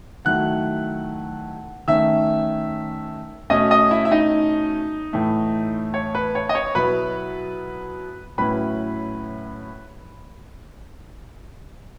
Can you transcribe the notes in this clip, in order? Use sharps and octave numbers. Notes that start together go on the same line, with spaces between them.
D#3 F#3 A3 E4 F#5 F#6
D#3 A3 C#4 E5 E6
B2 A3 C#4 D#5 D#6
D#5 D#6
E4 E5
E5
D#4 D#5
A2 E3 A3
C#5
B4
C#5
D#5
C#5
C#6
B2 F#3 B3 E4 B4 B5
A2 F#3 C#4 E4 B4 B5